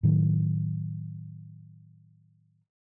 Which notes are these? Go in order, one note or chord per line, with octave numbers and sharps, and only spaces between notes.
A2 D#3 F#3